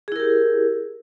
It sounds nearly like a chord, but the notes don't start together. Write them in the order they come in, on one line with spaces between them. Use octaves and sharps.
G#4 E4 A#4 G4